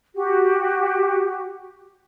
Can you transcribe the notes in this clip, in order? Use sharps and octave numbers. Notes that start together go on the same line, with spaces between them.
F#4 G4